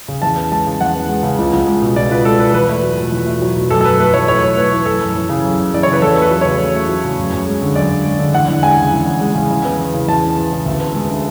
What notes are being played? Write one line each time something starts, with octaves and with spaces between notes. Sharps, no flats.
C#3
E2 A5
B3
G#3 A5
C#3
E2 F#5
B3
G#3
C#3
C#2
C#2
G#3
B2
C#2 D5
C#2 B4
G#3 A4
B2 B4
E2 B4
A3
F#3
B2
E2
A3
F#3
B2
F#2 A4
A4
F#2 B4
A3 B4
E3 C#5
F#2 C#5
F#2
A3 B4
E3
F#2 A4
F#2
E3
C#3
F#2
F#2
E3 D5
C#3 C#5
B4
E2 A4
A3 B4
F#3
C#3 C#5
E2
A3
F#3
C#3
F#2
F#2
G#3
D3
F#2 D5
F#2
G#3
D3
E2 F#5
E2
G#3 G#5
C#3
E2
E2
G#3
C#3
E2
B3
E3
C#3
E2 A5
B3
E3
C#3
D2
B3
G#3
D3